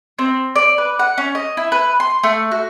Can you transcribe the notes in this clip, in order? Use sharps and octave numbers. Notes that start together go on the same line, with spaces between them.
C4
D5
B4
F#5
C#4
D#5
E4
B4
C6
A3
F#4